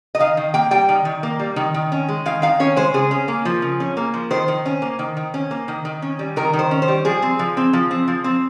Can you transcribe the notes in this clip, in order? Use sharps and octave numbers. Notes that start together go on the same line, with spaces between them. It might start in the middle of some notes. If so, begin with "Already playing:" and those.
D#5
D#3 F5
D#3
A#3 G5
G3 G5
D#3
D#3
A#3
G3
D#3
D#3
C#4
G#3
D#3 F5
D#3 F5
C#4 C#5
G#3 C5
C#3 G#4
C#4
A#3
F3
C#3
C#4
A#3
F3
D#3 C5
D#3
C#4
A#3
D#3
D#3
C#4
A#3
D#3
D#3
C#4
G3
D#3 A#4
D#3
C5
C#4
C5
G3
F3 G#4
C4
F3
C4
F3
C4
F3
C4